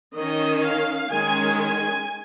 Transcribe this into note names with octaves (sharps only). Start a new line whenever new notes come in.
D#3 C#4 D#5
F5
D#3 G#3 C#4 G#5
G#5